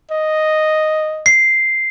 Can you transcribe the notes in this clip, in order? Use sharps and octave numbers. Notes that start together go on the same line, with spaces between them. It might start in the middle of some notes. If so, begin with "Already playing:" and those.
D#5
C7